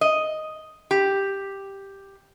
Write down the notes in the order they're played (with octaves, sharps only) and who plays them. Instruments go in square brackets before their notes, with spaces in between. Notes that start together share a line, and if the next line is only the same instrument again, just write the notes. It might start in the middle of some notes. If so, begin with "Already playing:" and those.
[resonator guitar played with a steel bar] D#5
G4